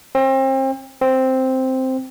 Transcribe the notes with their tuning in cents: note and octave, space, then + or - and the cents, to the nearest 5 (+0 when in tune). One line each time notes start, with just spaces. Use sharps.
C4 +35
C4 +0